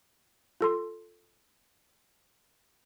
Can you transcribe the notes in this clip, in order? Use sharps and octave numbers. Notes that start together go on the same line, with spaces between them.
F4 A4 C6